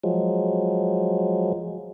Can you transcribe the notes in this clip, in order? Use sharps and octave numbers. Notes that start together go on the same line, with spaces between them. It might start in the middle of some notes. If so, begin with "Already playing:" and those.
F3 F#3 G#3